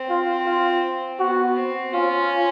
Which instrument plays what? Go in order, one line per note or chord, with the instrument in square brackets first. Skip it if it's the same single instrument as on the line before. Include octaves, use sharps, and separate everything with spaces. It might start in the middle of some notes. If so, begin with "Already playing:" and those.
Already playing: [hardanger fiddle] C4
[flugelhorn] F4
F4
[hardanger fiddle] B3 [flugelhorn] F#4
[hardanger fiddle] C4
[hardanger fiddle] C#4 [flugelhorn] F4